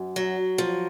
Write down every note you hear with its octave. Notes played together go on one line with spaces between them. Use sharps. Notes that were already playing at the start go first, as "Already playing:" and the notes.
Already playing: F#2
F#3
F3